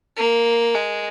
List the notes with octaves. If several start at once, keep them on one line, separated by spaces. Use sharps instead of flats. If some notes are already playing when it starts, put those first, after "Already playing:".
A#3
G#3